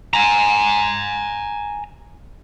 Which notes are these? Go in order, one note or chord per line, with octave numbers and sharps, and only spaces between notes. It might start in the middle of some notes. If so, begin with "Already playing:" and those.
G#5 A#5